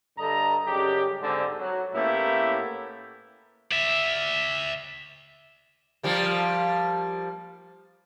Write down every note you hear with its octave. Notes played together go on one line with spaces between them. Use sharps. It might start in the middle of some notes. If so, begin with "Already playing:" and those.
G2 D3 A4 D#5 A#5
F#2 C#3 G3 D#4 G4
G#2 D3 C4
F#3
A2 A#3 B3 C#4 E4 G4
D5 E5
F3 G3 A#3